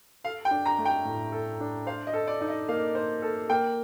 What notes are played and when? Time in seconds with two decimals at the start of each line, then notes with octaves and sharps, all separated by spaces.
0.24 A4 F5
0.45 G5
0.51 D4
0.66 A#5
0.79 A3
0.85 G5
1.05 A2
1.32 A4
1.60 D4
1.87 C5 F5
2.07 D#5
2.13 A4
2.27 D5
2.41 D#4
2.48 D#5
2.69 A#3 F5
2.95 C5
3.22 A4
3.50 A#3 G5